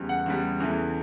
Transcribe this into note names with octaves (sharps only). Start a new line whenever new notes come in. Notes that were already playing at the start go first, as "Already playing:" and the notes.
Already playing: E2 C#3 G3
F#5
E2 C#3 G3
E2 C#3 E3 A3